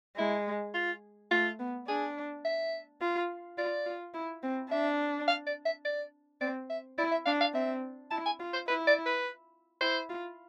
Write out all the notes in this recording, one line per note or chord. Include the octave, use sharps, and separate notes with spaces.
G#3 E4
F4
A3 F4
B3
D4 G#4
E5
F4
F4 D5
F4
E4
C4
D4 E5
F5
D5
E5
D5
C4 D5
E5
E4 D5
E5
D4 F5
F5
C4 E5
E4 A5
G#5
F4
C5
E4 B4
D5
B4
E4 C5
F4